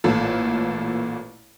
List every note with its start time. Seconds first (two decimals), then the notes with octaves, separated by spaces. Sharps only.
0.04 A1 A#2 A4